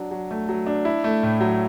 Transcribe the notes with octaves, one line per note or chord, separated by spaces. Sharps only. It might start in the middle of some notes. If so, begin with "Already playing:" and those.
Already playing: F#3 D4
F#3
A3
F#3
D4
E4
A3
A2
F#3